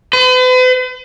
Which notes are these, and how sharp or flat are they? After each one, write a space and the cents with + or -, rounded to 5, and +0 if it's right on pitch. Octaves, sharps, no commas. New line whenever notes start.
B4 +45